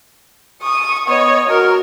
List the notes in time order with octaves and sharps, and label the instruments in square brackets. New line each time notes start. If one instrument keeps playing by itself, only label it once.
[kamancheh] C#6 [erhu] D#6
[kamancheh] B3 D#5 [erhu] C#5
[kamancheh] F#4 [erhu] A#4